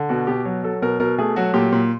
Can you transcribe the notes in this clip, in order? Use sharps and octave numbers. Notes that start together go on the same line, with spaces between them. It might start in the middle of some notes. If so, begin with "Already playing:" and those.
Already playing: D3
B2 F#4
B2 G4
F#3
F#3 A4
B2 A#4
B2 A#4
A3 G#4
F#3 F#4
A#2 G4
A#2